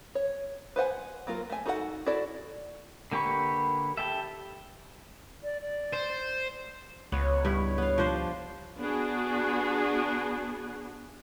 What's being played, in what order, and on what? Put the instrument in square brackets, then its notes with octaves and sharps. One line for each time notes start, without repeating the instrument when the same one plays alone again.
[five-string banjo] C#5
B4 C5 F#5 G#5
F#3 A#3 F4 A#4
A3 G#5
D#4 F#4 A4 A#4 F#5
E4 F#4 A4 D5
[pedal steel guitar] D3 A#3 G4 B4 C#6
G4 A4 E5
[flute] D5
D5
[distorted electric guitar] C5
[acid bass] C#2 [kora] B3 [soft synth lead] C#5
[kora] G2 E4
B3 F5
F3 D4 C5
[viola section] B3 D4 F#4 G#4